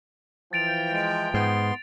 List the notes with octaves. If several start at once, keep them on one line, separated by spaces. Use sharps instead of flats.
E3 F3 G5 A6 D7 F7
G#3 A6 D7
G#2 B3 C6